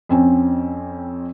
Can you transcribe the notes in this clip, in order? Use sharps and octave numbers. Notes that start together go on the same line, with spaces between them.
F2 C4 C#4